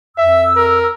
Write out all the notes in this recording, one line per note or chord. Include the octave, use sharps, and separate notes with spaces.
F2 E5 E6
A#4